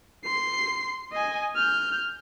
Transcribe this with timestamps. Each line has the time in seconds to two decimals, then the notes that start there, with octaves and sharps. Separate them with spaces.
0.24 C6 C7
1.13 D#5 G#5
1.55 F6 G6